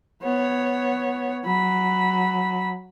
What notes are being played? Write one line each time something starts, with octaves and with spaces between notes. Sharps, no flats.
B3 C#5
F#3 B5